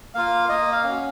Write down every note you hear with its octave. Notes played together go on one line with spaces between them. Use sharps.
A#3 F4 F5
A#3 D#5
F5
C#4 F#4